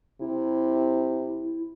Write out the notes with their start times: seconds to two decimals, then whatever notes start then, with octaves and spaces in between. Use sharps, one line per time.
0.21 C3 E4